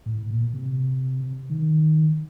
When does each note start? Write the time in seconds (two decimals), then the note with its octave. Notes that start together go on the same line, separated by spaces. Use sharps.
0.06 A2
0.30 A#2
0.53 C3
1.50 D#3